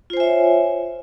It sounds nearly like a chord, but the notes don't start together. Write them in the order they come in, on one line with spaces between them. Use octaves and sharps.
F4 C5 G#5 E5 C#5